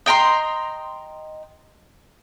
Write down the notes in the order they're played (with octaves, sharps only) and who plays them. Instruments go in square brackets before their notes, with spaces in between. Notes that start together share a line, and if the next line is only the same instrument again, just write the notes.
[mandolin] D#5 G5 A#5 C6